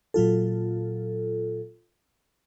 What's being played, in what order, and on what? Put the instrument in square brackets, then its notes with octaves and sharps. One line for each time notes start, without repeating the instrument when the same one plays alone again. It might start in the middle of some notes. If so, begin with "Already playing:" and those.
[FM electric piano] A#2 F#3 F4 A4